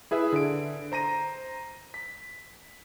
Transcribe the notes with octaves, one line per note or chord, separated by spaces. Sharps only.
E4 G#4 B4 E5
D3 D7
C5 A#5 A#6 D#7
B6